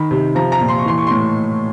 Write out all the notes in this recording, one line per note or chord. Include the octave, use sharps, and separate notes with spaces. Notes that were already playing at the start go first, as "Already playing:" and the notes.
Already playing: D#3 B5
C3
F3 A#5
A#5
A#2
C6
C#6
E3 C6
C#6
A2 C6